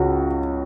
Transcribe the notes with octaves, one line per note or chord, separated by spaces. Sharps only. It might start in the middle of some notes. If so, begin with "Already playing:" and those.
Already playing: C#2 F#4